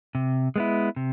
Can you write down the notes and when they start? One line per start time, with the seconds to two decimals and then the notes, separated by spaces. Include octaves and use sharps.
0.15 C3
0.56 G#3 B3 E4
0.96 C3